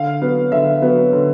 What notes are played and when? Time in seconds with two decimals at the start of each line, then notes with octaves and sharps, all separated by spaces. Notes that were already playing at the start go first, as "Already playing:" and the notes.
Already playing: D3 F5
0.21 F#3 B3
0.52 D3 E5
0.82 F#3 B3
1.13 D3